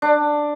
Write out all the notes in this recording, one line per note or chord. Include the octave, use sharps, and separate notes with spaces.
D4